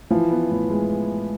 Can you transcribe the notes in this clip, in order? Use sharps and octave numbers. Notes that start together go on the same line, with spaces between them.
E3 F3
B3
A2
G#3